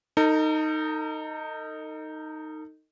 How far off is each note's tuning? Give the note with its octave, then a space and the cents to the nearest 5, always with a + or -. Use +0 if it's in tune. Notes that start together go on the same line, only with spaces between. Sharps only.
D#4 +0 A4 +45